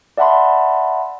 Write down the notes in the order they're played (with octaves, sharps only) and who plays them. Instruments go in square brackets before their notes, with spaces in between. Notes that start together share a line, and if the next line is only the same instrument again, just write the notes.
[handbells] D5 E5 F#5 A5 B5 C6